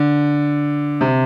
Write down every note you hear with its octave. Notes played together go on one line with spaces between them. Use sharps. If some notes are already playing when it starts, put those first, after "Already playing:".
Already playing: D3
C3